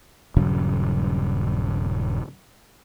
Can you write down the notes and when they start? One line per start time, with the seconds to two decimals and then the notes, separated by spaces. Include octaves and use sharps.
0.36 D#1 G2 C#3 F#3